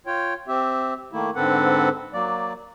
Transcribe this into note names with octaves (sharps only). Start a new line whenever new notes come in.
F4 C#5 G5
C4 G4 E5
D#3 A3 A#3 E4
G#2 D3 C4 A4 B4 F#5
F#3 A#3 D5